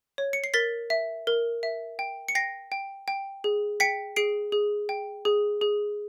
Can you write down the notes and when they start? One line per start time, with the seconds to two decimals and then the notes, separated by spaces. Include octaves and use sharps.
0.18 C#5
0.33 C#7
0.44 C7
0.54 A#4 A6 B6
0.90 E5
1.27 A#4
1.63 E5
1.99 G5
2.28 C#7
2.35 G5 A#6 C7
2.72 G5
3.08 G5
3.44 G#4
3.80 G5 B6 C#7
4.16 G#4 C7 D7
4.52 G#4
4.89 G5
5.25 G#4
5.61 G#4